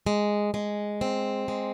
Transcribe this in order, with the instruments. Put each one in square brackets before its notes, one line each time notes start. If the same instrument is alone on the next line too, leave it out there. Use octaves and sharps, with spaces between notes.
[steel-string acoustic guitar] G#3
G#3
C4
G#3